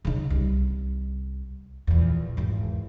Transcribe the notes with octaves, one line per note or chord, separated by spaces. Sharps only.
C#3 D#4
C2
A#1 E2
G#1 E2